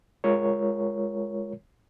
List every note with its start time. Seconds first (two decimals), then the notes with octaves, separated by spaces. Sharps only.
0.24 G#3 F4 A#4 C#5